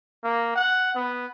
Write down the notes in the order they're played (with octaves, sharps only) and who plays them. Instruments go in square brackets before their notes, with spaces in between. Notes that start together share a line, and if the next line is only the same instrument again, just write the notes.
[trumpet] A#3
F#5
B3